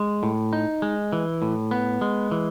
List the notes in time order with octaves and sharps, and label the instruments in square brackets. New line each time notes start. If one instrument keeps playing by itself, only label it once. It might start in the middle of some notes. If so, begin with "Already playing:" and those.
Already playing: [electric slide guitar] G#3
A2
D#4
G#3
E3
A2
B3
G#3
E3